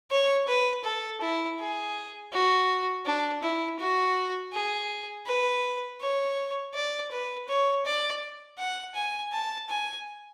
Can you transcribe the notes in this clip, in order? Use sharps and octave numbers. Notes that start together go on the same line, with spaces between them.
C#5
B4
A4
E4
G#4
F#4
D4
E4
F#4
G#4
B4
C#5
D5
B4
C#5
D5
F#5
G#5
A5
G#5